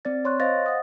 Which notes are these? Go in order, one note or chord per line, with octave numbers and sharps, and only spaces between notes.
C4 D5 A6
C#5 C6 C#6 F#6
C5 D#5 F5 A6 A#6
F#5 D#6